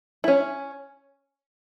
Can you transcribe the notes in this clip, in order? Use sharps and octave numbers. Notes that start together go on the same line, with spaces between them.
E4
C#4